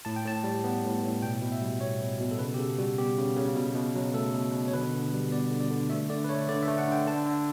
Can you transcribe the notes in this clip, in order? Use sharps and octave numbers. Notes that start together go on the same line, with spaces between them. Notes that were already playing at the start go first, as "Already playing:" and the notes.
A2 A5
G5
A2 A5
G3
B3
A2
A2
B2 G5
B2
E5
G3
B3 C#5
B2
B2
A4
C#3 B4
G4
C#3 A4
G3 F#4
B3 G4
C#3
C#3
B2
B2
F#3
A3 A4
B2
B2
C#5
D3 B4
D3
G3
B3 D5
D3
D5
D3
A3 E5
D3 D5
B4
A3 C#5
D3 D5
E5
A3
F#5
D3 G5
D3 A5
D3